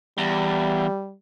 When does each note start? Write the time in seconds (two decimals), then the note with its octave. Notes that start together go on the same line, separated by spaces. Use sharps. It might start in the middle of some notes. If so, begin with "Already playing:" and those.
0.18 E2 G3